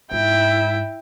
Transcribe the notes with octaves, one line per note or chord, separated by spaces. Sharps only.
G#2 E4 G5